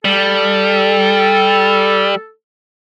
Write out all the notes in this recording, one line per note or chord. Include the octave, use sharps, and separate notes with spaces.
G3 A4